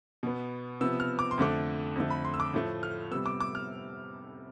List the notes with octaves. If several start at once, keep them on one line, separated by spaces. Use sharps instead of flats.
B2 B3
C3 F3 B3 E6
F6
D6
C6
F2 D3 A3 D6
F2 D3 A3
B5
C6
E6
D6
A2 F3 A3
F6
C3 G3 B3 E6
D6
D6
F6